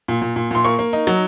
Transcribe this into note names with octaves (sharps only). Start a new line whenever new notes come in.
A#2
A#2
A#2
A#2 C6
A#3 C#6
A#3
D#4
F#3